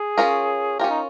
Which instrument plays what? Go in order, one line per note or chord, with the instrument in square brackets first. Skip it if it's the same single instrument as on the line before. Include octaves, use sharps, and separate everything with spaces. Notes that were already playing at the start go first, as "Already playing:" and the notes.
Already playing: [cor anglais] G#4
[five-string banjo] C#4 F4 A#4
[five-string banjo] C#4 F4 A#4 [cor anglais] G4
[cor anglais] D#4